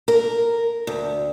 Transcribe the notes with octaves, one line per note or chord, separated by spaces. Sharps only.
A#4
D2